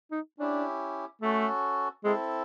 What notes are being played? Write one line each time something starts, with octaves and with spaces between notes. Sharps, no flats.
D#4
C#4 D4 E4 G4
A3 C#4 F#4 A4
G#3 C4 E4 A4